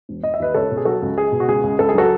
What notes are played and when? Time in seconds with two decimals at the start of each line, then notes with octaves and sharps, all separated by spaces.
0.09 E1
0.23 E1 D#5
0.34 E5
0.40 D#2 B4 D#5
0.54 C#2 A4 C#5
0.71 B2
0.77 G#4
0.85 F#3 F#4 A4
1.02 C#2
1.17 G#3 G#4
1.32 B2
1.40 F#4
1.48 C#2 G#4
1.63 C#2
1.79 C#2 A4
1.89 G#4
1.94 F#3 F#4 A4